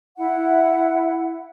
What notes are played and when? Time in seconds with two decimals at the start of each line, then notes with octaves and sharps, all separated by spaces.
0.18 E4 F#5